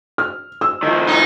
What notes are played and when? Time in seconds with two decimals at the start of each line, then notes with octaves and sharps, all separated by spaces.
0.18 F6
0.61 E6
0.83 D#3 F3
1.09 D#4 D#5